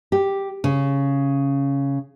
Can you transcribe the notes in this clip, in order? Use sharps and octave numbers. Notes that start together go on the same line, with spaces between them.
G4
C#3